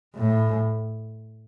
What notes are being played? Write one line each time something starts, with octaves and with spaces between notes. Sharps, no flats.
A2